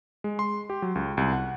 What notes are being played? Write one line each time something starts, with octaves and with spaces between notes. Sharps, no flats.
G#3
C6
G4
F#3
C#2
C2
F#5